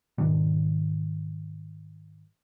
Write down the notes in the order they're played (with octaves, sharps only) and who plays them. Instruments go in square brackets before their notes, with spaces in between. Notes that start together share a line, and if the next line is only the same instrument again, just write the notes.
[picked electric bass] G#2 B2 D#3 G3